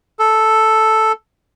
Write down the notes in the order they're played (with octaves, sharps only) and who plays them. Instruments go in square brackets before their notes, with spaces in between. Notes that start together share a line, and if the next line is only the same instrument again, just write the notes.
[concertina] A4